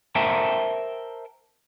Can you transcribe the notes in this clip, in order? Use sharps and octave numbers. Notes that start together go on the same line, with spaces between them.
A#4 C5 E5 G5 A5 A#5